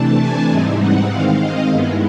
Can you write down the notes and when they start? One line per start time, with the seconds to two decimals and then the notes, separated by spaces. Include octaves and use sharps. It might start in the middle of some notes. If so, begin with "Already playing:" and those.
Already playing: C3 E3 A3 D4 A5
0.20 G#5
0.49 G#2 E3 G3 C4 D#4
0.80 F#5
1.09 D#3 G#3 C4 F5
1.39 D#5
1.69 G2 D#3 G#3 B3 E4